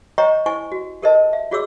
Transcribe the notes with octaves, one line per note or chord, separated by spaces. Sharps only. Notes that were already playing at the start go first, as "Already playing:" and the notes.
C5 C#5 D#5 G5 A#5 C#6
E4 C5 G#5 C#6
F#4
G4 A4 A#4 C5 D#5 A5
E5
F4 F#4 G#4 C#5 D6 E6